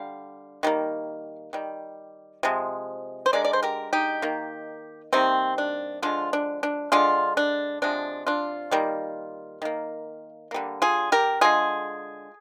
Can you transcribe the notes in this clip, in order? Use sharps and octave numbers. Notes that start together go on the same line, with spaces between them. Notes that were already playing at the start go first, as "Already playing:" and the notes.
Already playing: D3 G3 F5
D#3 G3 A#3
D#3 G3
C3 F3 G#3
C5
D3 G#3 A#4 D5
D5
C5
G4 A#4
D#4 G4
D#3 A#3
C3 D#3 G3 A#3 C4
D4
D3 F3 G#3 D4 F4
D4
D4
D3 G#3 D4 F4
D4
C3 F3 G#3 D4
D4 F4
D#3 G3 A#3
D#3 A#3
D3 G3 A#3
F4 G#4
G4 A#4
D3 G#3 F4 G#4